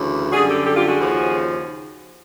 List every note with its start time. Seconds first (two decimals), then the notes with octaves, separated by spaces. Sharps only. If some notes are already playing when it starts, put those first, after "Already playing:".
Already playing: D2 C#3 E3
0.32 F#2 D3 G3 F#4 G#4
0.49 G4 A4
0.65 G4 A4
0.76 F4 G4
0.88 F#4 G#4
0.99 D#2 C#3 F3